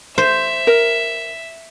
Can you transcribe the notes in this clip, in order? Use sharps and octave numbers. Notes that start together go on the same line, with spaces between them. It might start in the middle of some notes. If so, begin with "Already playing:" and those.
C5 E5
A#4